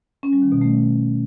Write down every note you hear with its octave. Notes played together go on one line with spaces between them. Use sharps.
C#4
G3
D#3
B2
A3